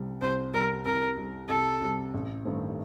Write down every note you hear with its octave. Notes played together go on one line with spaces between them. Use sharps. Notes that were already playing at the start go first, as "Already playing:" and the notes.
Already playing: C2 C3 G3
C2 C5
C3 G3 A#4
C2 A#4
C3 G3
C2 A4
C3 G3
A1
G2 D#3 A3 C4